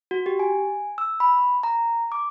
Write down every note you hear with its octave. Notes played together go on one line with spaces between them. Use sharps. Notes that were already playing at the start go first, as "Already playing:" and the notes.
F#4
G4
G#5
E6
B5
A#5
D6